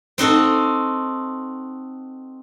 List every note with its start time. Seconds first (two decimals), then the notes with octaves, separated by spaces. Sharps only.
0.18 C4 D#4 F#4 A4